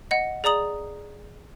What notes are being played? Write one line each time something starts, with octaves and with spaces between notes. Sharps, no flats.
D#5 F#5
G#4 D5 A#5 D#6 F#7